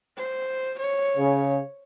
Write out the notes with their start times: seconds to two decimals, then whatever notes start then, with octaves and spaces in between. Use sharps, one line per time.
0.17 C5
0.78 C#5
1.18 C#3